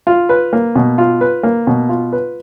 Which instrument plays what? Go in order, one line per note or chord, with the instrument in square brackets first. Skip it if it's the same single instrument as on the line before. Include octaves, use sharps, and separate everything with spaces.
[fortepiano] F4
B4
A#3
B2
F4
B4
A#3
B2
F4
B4